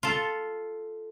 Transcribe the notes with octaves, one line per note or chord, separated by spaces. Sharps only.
F4 A4